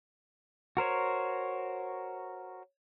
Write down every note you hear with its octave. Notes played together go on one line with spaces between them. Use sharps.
F#4 A#4 C5 C#5